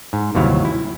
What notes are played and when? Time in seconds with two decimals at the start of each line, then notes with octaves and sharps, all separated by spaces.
0.13 G#2
0.35 G1 D#2 C3 F#3 E4 F5
0.65 E4